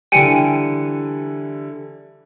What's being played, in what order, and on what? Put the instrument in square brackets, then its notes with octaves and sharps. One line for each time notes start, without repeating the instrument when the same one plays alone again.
[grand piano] D3 E3 G3 [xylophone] G5 G#5 C#7